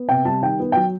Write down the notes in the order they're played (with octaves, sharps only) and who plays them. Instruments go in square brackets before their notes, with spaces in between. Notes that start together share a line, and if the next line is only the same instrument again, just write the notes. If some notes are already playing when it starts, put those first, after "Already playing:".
Already playing: [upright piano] B3
C3 G5
G3 A5
D#3 G5
B3
F#3 G5